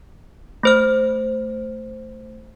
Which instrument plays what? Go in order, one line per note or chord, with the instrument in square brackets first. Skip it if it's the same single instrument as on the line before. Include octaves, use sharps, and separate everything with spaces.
[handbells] A3 C5 F6